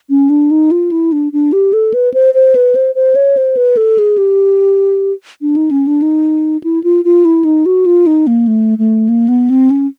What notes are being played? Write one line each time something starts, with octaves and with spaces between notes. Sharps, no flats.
C#4
D4
D#4
F4
E4
D4
D4
G4
A4
B4
C5
C5
B4
C5
C5
C#5
C5
B4
A4
G#4
G4
D4
D#4
C#4
D4
D#4
E4
F4
F4
E4
D#4
F#4
F4
D#4
A#3
A3
A3
A#3
B3
C4
C#4